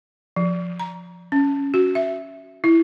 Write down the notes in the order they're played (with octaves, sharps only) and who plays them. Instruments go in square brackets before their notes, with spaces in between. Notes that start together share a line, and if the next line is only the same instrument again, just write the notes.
[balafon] F3
A#5
C#4
F#4
E5
E4